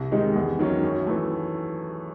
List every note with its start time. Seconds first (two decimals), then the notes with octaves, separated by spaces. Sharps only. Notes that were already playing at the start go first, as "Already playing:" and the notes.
Already playing: C2
0.12 C3 D#3 G#3 D#4
0.35 E2
0.59 D#3 F#3 C#4
0.83 F#2
1.07 E3 A3